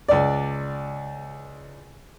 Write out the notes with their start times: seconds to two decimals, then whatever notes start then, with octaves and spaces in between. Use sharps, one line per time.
0.09 C#2 D5